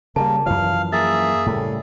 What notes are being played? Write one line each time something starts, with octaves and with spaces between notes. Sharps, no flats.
C#3 G3 A#3 A5
F#2 E3 F3 F5
A#3 G#4 E5 A6
A2 C#3 G3 A3